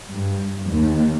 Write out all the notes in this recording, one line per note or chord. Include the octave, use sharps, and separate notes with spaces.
G2
D#2